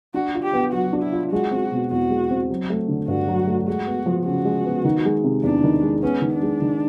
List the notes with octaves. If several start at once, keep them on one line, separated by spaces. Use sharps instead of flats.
D4 F#4
F4
G4
B3
F#3 F#4
D4
E4
F4
G#3 F#4
C4
B2
E2 F#4
G#3
C4
F#3
A3
D3
G2 F#4
F#3
A3
G#3 F#4
B3
F3
C#3 F#4
G#3
B3
D#3
G#3
C3
E2 D4
D#3
G#3
B3 C#4
D#3
D4
G#3
D#3